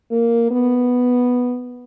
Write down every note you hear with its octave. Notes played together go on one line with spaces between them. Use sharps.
A#3
B3